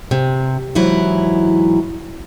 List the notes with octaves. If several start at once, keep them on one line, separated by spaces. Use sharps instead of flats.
C3
G#2 E3 F#3 E4